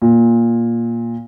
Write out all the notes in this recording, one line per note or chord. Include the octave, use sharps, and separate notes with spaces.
A#2